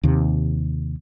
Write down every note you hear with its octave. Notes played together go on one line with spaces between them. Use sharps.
D#2 C3